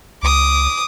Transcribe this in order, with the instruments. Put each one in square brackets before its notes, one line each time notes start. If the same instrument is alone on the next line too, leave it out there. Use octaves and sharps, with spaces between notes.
[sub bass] C#2 [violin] D6 D#6